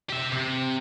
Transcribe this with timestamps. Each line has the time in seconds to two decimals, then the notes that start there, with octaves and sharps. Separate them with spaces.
0.10 G4 E5
0.33 C3